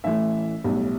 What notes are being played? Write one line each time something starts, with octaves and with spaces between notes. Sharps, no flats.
A1 A2 E3 A3 E5
B1 A2 G3